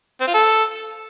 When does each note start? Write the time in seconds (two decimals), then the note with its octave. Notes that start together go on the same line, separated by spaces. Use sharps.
0.21 C4
0.27 F4
0.34 A4